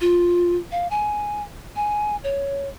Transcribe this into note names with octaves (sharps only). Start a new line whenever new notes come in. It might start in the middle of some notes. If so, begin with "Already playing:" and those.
F4
F5
G#5
G#5
C#5